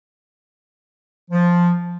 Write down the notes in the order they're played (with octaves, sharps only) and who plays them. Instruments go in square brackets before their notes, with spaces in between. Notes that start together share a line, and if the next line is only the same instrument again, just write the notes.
[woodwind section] F3